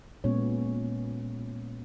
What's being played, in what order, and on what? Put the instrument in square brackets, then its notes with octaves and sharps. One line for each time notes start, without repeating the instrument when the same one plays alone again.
[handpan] A#2 G#3 B3 C#4 C#5